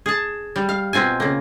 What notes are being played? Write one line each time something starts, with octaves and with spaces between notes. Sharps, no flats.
G#4 A5
G3
F5
B2 C4 F4 G#5
C#3 A#3